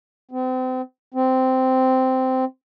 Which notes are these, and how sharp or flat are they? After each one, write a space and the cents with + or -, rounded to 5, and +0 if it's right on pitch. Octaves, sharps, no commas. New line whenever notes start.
C4 -35
C4 -10